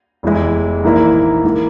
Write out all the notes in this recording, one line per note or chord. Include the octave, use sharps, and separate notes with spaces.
F1 E2 E3 G#3 E4
A#1 G#2 E3 A#3 E4
G#2 E3 A#3